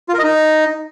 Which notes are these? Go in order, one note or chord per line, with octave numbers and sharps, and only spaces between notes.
F4
A#4
D#5
D#4